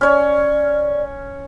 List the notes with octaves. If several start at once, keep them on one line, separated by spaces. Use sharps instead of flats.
C#4 C#5 D5